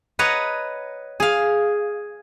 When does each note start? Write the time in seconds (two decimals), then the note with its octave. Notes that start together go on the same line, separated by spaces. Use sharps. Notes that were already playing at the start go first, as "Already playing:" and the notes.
0.19 B4 C#5 D#5 F#5 A#5
1.20 G#4 F5